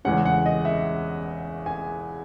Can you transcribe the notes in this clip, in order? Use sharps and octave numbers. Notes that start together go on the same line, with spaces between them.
E2 C#3 G#3 C#4 F#5
F#5
D#5
E5
G#5